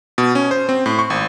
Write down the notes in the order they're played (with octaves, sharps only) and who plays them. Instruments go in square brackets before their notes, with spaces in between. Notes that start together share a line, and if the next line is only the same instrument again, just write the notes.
[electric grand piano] B2
C#4
C5
C4
A2
C#6
G#1